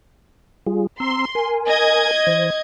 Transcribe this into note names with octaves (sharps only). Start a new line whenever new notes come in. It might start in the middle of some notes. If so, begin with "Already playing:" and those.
G3 F4 G#4
C4 A#5 C6 E6
A#4 G#5
D#5 G#6
E3 C5